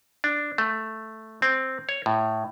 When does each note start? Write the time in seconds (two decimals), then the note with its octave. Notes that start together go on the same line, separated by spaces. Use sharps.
0.24 D4
0.58 A3
1.42 C4
1.89 C#5
2.06 A2